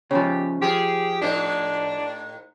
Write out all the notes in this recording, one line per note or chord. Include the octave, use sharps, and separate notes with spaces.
C#3 F3 G4 C#5
F3 G4 G#4
A2 D4 D#4 C5